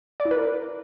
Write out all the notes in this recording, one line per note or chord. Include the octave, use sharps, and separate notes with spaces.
D5
E4
B4
A#4